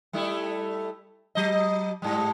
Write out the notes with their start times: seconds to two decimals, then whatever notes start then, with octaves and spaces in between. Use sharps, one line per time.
0.13 G3 A3 E4
1.35 F#3 D#5
2.02 G#2 G3